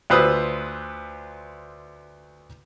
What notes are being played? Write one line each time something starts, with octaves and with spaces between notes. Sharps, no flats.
D2 F4 B4 C5 D#6 E6